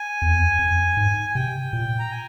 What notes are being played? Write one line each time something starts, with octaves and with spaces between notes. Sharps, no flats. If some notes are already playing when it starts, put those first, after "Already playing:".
Already playing: G#5
E2
F2
E2
F2
G#2
G#5
C3 G5
A#2
A#5
G#5